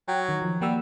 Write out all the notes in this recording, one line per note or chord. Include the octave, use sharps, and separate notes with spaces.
F#3 G5
D#3
F3
G3 A#3 F#5 E6